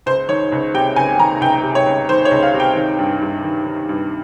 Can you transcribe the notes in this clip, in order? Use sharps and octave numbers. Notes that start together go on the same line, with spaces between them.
C#2 C5
D#3 C#5
C#2
C3 G5
C#2 G#5
D#3 A#5
C#2 G5
C3
C#5
C#2
D#3 C5
C#5
C#2
F5
C3
G5
D#3
G2
G2
D#3
D#3
G2